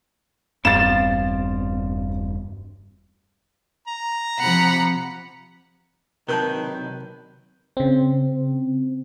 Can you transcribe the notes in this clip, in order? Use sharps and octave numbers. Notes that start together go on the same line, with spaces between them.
E1 G2 B3 C4 F5 A6 E7
A#5
C3 F3 F#5 B5
C3 D#3 F#3 A#4 B4 A5 G6
C#3 C4